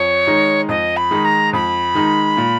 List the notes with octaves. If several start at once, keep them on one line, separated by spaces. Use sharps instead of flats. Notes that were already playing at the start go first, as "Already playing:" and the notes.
Already playing: F2 C#5
D#3 G#3 D#4
F2 D#5
B5
D#3 G#3 D#4
A#5
F2 B5
D#3 G#3 D#4
A#2